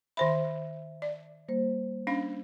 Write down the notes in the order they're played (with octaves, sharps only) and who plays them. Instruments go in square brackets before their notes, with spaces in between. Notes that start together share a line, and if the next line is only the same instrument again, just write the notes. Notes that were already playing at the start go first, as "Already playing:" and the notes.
[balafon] D#3 C5 B5 [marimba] E5
[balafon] D5
[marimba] G3 A#3 C5
[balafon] C#4 D4 F5